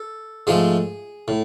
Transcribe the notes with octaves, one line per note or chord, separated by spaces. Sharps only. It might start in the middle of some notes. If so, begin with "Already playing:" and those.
Already playing: A4
G#2 F3 A3 G#4
A2